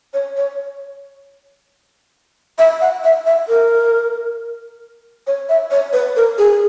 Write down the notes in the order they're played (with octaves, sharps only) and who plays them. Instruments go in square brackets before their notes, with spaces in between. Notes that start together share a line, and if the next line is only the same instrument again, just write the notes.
[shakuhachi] C#5
C#5
E5
F#5
E5
E5
A#4
C#5
E5
C#5
B4
A#4
G#4